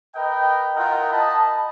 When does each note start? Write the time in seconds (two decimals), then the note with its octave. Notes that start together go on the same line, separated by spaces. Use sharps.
0.16 A#4 B4 D#5 G5
0.77 E4 F4 A#4 D#5 F#5 G5
1.11 D#5 A5 B5